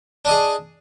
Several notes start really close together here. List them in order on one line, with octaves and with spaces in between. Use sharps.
D4 D#5 G#4